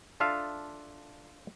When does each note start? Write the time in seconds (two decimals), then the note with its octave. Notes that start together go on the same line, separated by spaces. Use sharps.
0.20 D4 F4 A4 E5 F5